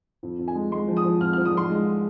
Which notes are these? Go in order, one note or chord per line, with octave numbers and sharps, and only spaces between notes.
F2
F2
G#5
G#3
G#3 C6
F3
D#6
F3
F2 F6
F3 F6
D#6
F3 C6
G#3